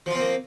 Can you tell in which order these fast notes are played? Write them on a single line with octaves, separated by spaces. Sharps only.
F3 F4 C4 A#3